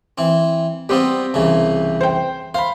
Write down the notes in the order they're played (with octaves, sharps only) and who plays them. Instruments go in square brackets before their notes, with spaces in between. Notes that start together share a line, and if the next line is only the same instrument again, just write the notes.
[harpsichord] E3 C4
[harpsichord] G3 B3 F4 [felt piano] C4 G4
[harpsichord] C2 C#3 E3
[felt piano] C5 G5
[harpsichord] C5 [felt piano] F5 B5